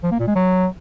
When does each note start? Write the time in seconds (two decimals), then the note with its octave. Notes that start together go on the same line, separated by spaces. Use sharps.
0.04 F3
0.12 A#3
0.20 A#2
0.28 G#3
0.36 F#3